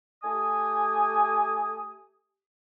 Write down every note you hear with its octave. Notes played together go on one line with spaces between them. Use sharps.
A3 G4 G#5 D#6